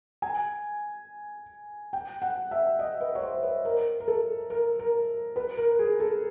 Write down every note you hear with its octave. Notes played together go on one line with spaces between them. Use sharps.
G#5
G5
F#5
E5
D#5
B4
C#5
C5
B4
A#4
A#4
A4
A#4
A#4
B4
A#4
G#4
A4